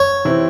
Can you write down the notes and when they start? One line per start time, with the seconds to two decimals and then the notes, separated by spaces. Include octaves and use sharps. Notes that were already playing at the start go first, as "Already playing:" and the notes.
Already playing: F#2 C#5
0.25 C3 E3 C4 E4